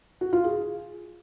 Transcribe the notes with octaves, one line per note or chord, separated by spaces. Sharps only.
F#4
F4
G#4